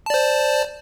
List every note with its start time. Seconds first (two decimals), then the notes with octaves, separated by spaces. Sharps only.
0.06 A5
0.10 D5
0.14 C5